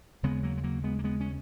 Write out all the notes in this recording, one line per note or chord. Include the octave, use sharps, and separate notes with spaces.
D#2 C#3 G#3 B3
F#3 A#3
G#3
F#3 A#3
G#3 B3
A#3
G#3 B3
C#4